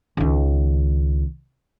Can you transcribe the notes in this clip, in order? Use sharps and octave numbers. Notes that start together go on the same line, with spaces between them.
C#2 D#3